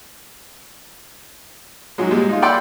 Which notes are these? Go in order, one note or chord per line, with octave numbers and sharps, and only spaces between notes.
G#2 F#3 G#3
A#2 G3 G#3
D#4 F4
D5 F#5 G5 B5 C6 E6